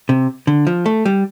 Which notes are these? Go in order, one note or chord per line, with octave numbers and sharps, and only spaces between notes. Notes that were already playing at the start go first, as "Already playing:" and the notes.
C3
D3
F3
A3
G3